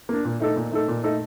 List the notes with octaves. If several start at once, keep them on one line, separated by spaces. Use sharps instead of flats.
A#3 D4
A#2
A3 D#4 A4
A#2
A3 D#4 A4
A#2
A3 D#4 A4